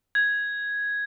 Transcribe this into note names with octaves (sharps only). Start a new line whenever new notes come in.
G#6